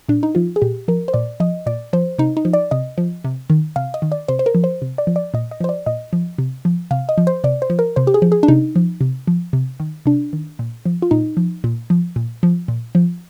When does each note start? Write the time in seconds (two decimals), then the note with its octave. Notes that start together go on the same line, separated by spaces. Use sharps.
0.09 A#2 D4
0.23 D#4
0.35 F3 F4
0.56 G#4
0.62 A#2 G4
0.88 F3 A#4
1.08 C5
1.13 A#2 D5
1.40 F3 D#5
1.66 A#2 D5
1.93 F3 C5
2.18 C3 D#4
2.37 D#4
2.45 F3
2.53 D5
2.71 C3 D#5
2.98 F3
3.24 C3
3.50 D#3
3.76 C3 F5
3.94 D#5
4.02 D#3
4.12 D5
4.28 C3 C5
4.39 C5
4.46 A#4
4.55 F3
4.64 C5
4.82 C3
4.98 D5
5.07 F3
5.16 D5
5.34 A#2 D#5
5.51 D#5
5.60 F3 C5
5.69 D5
5.86 A#2 D#5
6.13 F3
6.38 C3
6.65 F3
6.91 C3 F5
7.09 D#5
7.18 F3
7.27 C5
7.44 C3 D5
7.62 C5
7.70 F3
7.79 A#4
7.96 C3 C5
8.07 G4
8.14 G#4
8.22 F3
8.32 G#4
8.43 D4
8.48 C3 D#4
8.76 F3
9.01 C3
9.27 F3
9.53 C3
9.80 D#3
10.06 C3 D4
10.33 D#3
10.59 A#2
10.86 F3
11.02 F4
11.11 A#2 D#4
11.37 F3
11.64 A#2
11.90 F3
12.16 A#2
12.43 F3
12.68 A#2
12.95 F3